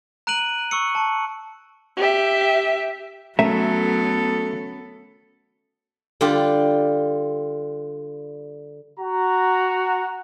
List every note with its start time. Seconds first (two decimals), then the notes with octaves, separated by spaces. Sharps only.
0.27 A#5 F#6 D7 D#7 F#7
0.71 C#6 E6 C#7
0.95 A5
1.97 G4 E5
3.39 F#3 A3 B3 C#4 A4 A#4 E5
6.21 D3 G3 F4 G4
9.00 F#4 A#5